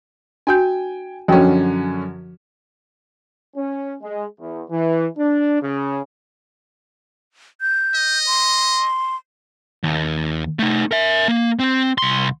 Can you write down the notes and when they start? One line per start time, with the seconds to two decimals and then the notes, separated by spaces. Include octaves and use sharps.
0.47 D4 F#4 G5 G#5 G6
1.28 F#2 D3 F3 C#4 F#4 G5
3.56 C#4
4.02 G#3
4.40 E2
4.70 E3
5.18 D4
5.62 C#3
7.61 G6
7.95 D#5
8.27 C6
9.84 D#2
10.59 A3 D#4
10.91 A#4 E5
11.28 A#3
11.59 C4
11.98 C2 C6